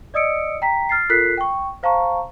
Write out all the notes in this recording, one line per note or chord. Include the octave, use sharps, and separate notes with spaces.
D5 D#5 D#6 E6 C#7 D7
G5 A#5 B6
F6 A6 C7
F4 A4 A#4 F#6 B6 C7
G5 C#6
C5 F5 A5 A#5 C#6